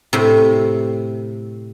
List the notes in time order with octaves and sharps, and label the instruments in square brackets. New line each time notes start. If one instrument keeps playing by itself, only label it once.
[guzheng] A2 C3